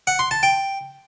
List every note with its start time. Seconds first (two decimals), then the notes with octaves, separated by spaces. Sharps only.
0.07 F#5
0.19 C6
0.31 A5
0.43 G5